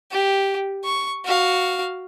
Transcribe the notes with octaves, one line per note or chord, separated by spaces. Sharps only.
G4
C#6
F#4 F5